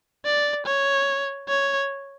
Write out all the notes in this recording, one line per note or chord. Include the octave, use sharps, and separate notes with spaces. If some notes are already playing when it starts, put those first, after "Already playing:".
D5
C#5
C#5